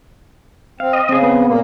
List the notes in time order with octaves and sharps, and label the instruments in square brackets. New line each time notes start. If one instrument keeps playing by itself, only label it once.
[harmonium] C4 [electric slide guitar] F5
[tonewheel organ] D#5
[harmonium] C#3 [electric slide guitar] C4 G#4
[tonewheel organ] B3
[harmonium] A#2 A#3